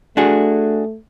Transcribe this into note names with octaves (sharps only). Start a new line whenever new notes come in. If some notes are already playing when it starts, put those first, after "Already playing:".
A3 D4 F#4 G#4